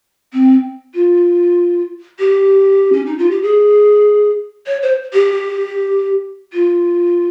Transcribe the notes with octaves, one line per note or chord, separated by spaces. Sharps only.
C4
F4
G4
C#4
D#4
F4
G4
G#4
C#5
C5
G4
F4